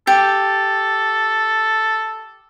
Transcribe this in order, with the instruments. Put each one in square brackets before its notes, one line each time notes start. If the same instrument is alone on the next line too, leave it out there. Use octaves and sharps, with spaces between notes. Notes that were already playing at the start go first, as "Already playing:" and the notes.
[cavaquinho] G4 [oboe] A4